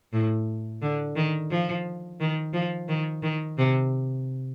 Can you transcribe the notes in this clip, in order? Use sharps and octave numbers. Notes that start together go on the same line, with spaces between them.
A2
D3
D#3
F3
D#3
F3
D#3
D#3
C3